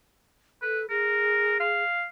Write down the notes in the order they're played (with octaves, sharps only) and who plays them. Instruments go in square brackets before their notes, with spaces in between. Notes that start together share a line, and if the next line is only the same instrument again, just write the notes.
[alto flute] A4 [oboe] B4
[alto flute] G#4 [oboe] A#4
[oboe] F5